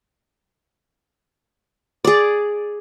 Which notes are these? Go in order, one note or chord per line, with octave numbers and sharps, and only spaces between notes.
G#4 D5